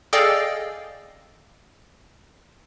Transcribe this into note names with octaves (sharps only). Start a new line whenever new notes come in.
G#4 A4 D5 D#5 F5 G5